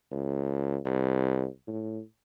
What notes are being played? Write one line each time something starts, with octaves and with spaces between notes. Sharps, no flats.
C#2
C2
A2